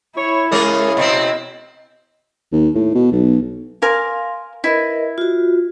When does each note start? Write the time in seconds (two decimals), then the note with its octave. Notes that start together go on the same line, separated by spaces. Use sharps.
0.17 E4 C#5
0.52 C#3 G#3 C#4 G#4 A#4 D#5
0.97 B2 C4 E4 D#5
2.52 D#2
2.74 A2
2.95 B2
3.12 B1
3.82 A#4 F5 G#5 C6 D6
4.64 E4 A#4 B4 D#5
5.18 F4 F#4